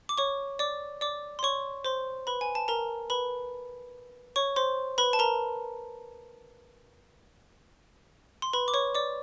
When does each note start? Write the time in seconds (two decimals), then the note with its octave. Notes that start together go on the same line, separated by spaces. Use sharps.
0.09 D6
0.18 C#5 C#6
0.59 D5 D6
1.01 D5 D6
1.39 C6
1.43 C#5 C#6
1.85 C5 C6
2.27 B4 B5
2.41 G#5
2.55 A5
2.68 A#4 A#5
3.10 B4 B5
4.36 C#5 C#6
4.56 C5 C6
4.98 B4 B5
5.13 A5
5.19 A#4 A#5
8.42 C6
8.53 B4 B5
8.68 D6
8.74 C#5 C#6
8.95 D5 D6